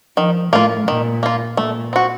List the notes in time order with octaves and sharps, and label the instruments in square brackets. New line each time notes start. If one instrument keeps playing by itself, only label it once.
[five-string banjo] D#3 [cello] F3
[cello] A2 [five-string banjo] A#3 F4
[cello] A#2 [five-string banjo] D#3
[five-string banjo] A#3 F4
[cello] A#2 [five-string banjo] A3
[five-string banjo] C4 F#4